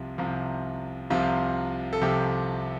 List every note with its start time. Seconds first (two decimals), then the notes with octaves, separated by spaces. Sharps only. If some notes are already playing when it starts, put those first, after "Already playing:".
Already playing: C2 C3 F3
0.18 C2 C3 F3
1.10 C2 C3 F3 F4
1.93 A4
2.01 C2 C3 F3 G4